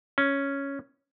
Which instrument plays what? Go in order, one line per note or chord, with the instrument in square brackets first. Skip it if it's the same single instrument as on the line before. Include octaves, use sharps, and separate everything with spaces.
[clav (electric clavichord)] C#4